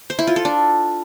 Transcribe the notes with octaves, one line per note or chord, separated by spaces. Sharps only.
C5
E4
F4
A4
D4